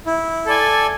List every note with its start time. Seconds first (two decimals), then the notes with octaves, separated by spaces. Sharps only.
0.06 E4
0.46 A4 D5 G#5